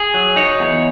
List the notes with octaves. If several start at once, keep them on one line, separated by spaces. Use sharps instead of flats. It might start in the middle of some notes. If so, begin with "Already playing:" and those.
Already playing: G#4
F#3
D#4 C#5
E2